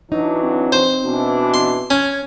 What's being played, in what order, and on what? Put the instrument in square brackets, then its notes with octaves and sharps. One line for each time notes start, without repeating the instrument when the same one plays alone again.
[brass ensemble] E3 F#3 D4 [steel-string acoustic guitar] D#4
[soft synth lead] C4
[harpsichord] C5
[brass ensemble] B2 E3 D4
[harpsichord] C6
[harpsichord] C#4 [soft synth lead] G#6